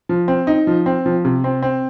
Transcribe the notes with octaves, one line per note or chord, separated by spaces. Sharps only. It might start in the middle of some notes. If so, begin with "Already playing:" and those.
F3
C4
D#4
F3
C4
F3
C3
C4
C4